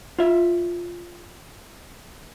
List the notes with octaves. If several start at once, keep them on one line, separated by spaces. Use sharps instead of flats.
F4 E5